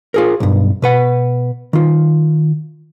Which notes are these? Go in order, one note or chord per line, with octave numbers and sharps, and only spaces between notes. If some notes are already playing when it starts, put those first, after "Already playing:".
F4 G#4 A#4
B1 G2
B2 B4 F#5
D#3 F4